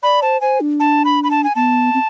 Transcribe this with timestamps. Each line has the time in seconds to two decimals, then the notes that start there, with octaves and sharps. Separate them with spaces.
0.03 D5 B5
0.22 C5 A5
0.41 C5 G#5
0.61 D4
0.80 A5
1.05 B5
1.24 B5
1.31 A5
1.44 G#5
1.56 B3 A5
1.94 C4